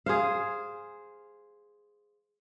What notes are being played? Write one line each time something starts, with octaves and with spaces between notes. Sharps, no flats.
G#4 C5 F5